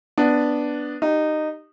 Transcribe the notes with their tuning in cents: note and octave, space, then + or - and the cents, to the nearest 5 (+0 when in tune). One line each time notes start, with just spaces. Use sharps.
B3 +0 D4 +0
D#4 -15 G4 -10